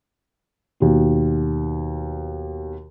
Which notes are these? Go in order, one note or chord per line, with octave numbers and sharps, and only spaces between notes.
D#2 B2